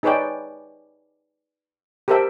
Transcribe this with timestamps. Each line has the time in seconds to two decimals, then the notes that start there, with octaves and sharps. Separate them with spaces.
0.03 D#4 G#4 B4 C#5 D5 G5
2.08 G4 A4 A#4 C5 E5 G5